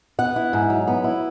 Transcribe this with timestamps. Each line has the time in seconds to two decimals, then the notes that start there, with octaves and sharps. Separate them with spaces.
0.19 B3 F#5
0.36 E4
0.53 G#2
0.70 F#3
0.87 B3
1.04 E4